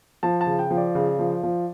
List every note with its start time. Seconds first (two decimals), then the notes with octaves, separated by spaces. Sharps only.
0.23 F3 A5
0.41 A5
0.47 C#3
0.59 G5
0.71 F3
0.77 D5
0.95 C#3
1.19 F3
1.43 F3